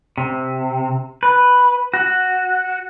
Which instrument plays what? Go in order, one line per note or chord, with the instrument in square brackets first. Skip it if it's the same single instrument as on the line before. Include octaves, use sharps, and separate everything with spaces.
[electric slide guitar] C3
B4
F#4